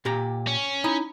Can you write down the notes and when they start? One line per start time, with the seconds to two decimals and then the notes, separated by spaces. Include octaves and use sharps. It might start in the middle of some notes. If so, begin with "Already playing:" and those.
0.05 A#2 G4 A#5
0.47 C#4
0.84 D#4 E4